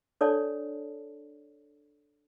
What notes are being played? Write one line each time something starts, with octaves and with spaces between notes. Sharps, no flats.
D4 A4 C#5 D5 A5